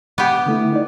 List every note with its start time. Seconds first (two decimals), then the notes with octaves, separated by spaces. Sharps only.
0.18 B3 G4
0.46 D3 A3 E4
0.73 D#4 D5